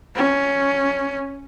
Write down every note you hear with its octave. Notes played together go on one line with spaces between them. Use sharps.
C#4